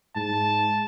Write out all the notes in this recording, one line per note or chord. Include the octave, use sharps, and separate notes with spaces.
G#2 A5